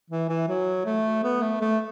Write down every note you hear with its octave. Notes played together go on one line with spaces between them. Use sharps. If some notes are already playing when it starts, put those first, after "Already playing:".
E3
E3
F#3
A3
B3
A3
A3